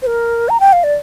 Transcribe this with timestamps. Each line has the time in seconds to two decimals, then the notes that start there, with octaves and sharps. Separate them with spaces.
0.02 C5
0.07 A#4
0.49 A#5
0.60 G5
0.73 F5
0.84 D5